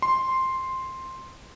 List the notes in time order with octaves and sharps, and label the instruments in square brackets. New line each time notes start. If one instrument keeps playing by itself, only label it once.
[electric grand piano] C6